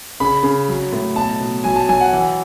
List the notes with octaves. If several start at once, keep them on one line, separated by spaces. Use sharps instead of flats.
C#3 B5
C#3
F#3
A2
B2 A5
B2
F#3 G#5
A5
F#3 G#5
F#5
E3